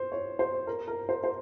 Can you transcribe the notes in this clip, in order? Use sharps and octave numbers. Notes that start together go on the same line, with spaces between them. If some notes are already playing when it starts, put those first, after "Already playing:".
Already playing: C5
C#5
C5
A#4
A#4
C5
C5